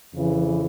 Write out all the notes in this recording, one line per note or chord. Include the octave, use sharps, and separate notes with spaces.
F2 C#3 E3